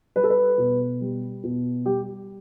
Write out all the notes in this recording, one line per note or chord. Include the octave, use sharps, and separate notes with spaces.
G3 B4
A4
B4
B2
G3
B2
G3 G4